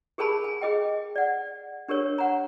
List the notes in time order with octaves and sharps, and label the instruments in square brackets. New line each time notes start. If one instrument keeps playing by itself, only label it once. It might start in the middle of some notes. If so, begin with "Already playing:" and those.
[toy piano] G4 G#4 A#4 G#5 A5 B5
G#5
G#4 D#5 G5
D5 F#5
D4 G4 A#4 C#5
F#5 A#5